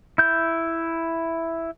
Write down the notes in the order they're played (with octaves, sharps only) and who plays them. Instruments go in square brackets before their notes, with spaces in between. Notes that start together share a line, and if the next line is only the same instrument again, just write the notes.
[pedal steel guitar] E4 G6